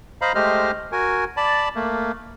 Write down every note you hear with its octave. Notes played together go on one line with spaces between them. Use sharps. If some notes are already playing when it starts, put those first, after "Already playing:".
C5 D#5 F5 A#5 B5
G#3 A3 G4 C5 D#5 F6
F#4 A#4 G#5
D5 A5 B5
A3 A#3